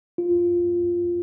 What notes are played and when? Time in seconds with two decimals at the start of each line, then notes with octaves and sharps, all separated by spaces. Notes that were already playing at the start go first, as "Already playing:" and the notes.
0.18 F4